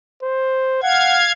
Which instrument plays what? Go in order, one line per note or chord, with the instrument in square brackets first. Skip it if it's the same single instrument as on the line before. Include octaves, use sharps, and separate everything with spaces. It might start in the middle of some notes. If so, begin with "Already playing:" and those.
[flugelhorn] C5
[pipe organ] F5 G#6 [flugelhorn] F#5